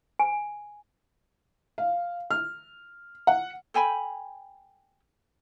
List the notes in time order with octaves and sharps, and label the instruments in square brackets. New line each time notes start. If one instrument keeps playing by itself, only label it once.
[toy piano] G#5
[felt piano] F5
F6
F#5
[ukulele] A4 G5 G#5 B5